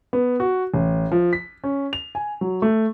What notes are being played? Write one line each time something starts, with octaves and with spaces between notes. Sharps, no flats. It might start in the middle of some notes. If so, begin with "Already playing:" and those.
B3
F#4
A1
F3
B6
C#4
F7
G#5
F#3
A3